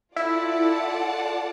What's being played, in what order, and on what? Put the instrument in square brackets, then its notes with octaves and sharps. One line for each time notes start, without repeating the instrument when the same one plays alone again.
[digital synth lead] E4 [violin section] F4 A4 D5 F#5 A5